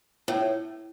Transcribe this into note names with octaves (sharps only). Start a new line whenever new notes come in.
A2